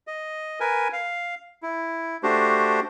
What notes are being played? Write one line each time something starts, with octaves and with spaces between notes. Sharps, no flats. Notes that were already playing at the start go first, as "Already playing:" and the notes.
D#5
A#4 B4 G#5
F5
E4
A3 D4 F#4 G4 C5